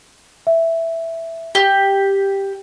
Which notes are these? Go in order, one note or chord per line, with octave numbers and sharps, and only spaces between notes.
E5
G4 G7